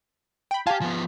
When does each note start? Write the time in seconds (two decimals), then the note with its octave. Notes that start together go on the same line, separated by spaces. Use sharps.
0.51 G5 B5
0.67 F4 G4 F5 G#5 A5
0.81 F3 B3